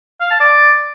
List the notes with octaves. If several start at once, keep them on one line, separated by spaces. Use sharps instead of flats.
F5
A5
D5